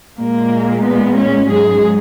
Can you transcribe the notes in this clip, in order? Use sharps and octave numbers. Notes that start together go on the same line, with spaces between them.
A#2 G#3 A#3
B3
C#4
G#2 F#3 G#4